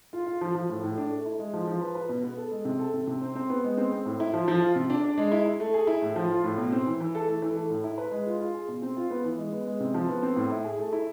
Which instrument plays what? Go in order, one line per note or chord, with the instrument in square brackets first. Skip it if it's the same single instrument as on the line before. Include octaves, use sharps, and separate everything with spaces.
[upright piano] F4
F4
F3
F3
A2
A2
D4
A3
E4
G#3
F3
F3
B4
B4
B2
B3
A4
G#3
C3
A4
C3
C3
C4
C4
B3
G#3
C4
C4
A2
E4
F3
F3
F4
C3
D4
D4
G#3
E4
E4
A3
G#4
E4
A2
F3
F4
A2
B2
C4
E3
E3
A4
A3
E3
A3
A2
E4
B4
G#3
F4
F4
G#4
B2
C4
F4
B3
E3
G#3
B3
G#3
C3
F3
B3
C4
A2
E4
G#4
A3
E4